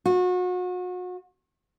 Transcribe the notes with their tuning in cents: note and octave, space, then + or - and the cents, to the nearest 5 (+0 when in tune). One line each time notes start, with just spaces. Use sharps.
F#4 -35